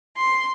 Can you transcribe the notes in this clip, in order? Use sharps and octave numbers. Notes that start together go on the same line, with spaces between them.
C6